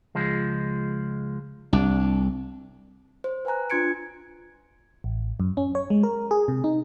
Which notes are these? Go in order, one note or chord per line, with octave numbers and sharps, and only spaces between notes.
C#2 F3 G#3
C2 D4
C5
B4 G5 G#5 A#5 F#6
D4 F4 C6 G#6 C#7 D7
A1
F#2
C#4
C#5
G#3
A#4
G#4
C3
D#4